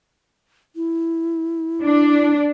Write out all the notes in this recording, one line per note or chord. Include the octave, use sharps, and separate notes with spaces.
E4
D4